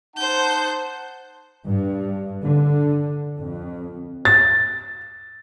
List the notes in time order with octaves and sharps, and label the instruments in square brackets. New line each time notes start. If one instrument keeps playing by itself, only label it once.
[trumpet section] D#4 F#5 A5 [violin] C5 G6
[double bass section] G2
D3
F2
[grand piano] A6